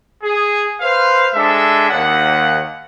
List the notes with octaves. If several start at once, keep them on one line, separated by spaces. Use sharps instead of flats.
G#4
B4 C5 F5
G#3 D4 A4 E5
D#2 F#5